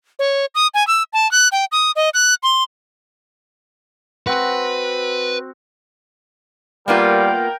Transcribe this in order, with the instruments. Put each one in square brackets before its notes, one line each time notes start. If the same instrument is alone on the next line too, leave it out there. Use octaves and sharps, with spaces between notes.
[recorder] C#5
D#6
G#5
E6
A5
F#6
G5
D#6
D#5
F#6
C6
[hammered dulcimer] C4 F#4 [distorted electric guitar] B4
[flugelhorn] G3 [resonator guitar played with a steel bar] A#3 B3 F4 [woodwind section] A#4 G5